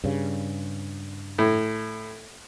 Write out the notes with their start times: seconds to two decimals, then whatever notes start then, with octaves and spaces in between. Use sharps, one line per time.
0.04 G2 C#3
1.38 A2